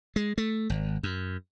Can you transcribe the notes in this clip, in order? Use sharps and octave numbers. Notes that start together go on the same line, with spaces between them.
G#3
A3
G#1
F#2